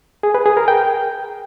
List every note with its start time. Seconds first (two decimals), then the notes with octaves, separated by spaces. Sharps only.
0.23 G#4
0.35 B4
0.46 G#4
0.57 A#4
0.68 G5